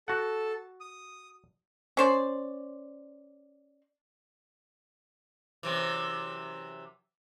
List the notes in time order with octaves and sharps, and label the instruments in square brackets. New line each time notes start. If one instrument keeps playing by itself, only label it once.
[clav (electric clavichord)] F#4 F#5 [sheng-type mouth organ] A4 A5
[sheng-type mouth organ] D#6
[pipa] C#4 C5 D5
[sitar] F#2 C3 E3